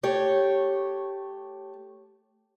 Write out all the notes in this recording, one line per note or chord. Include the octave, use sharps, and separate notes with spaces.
A3 G4 C#5